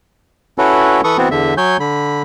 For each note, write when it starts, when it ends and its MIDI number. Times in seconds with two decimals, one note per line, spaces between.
0.58 1.01 61
0.58 1.01 64
0.58 1.01 66
0.58 1.01 69
0.58 1.01 71
0.58 1.01 73
1.04 1.17 52
1.04 1.17 69
1.04 1.17 71
1.04 1.17 85
1.04 1.17 87
1.18 1.29 52
1.18 1.29 59
1.18 1.29 60
1.18 1.29 66
1.31 1.54 40
1.31 1.54 50
1.31 1.54 76
1.57 1.77 54
1.57 1.77 73
1.57 1.77 80
1.57 1.77 91
1.80 2.22 50
1.80 2.22 83